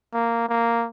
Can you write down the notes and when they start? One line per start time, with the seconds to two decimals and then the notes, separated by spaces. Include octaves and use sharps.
0.14 A#3
0.49 A#3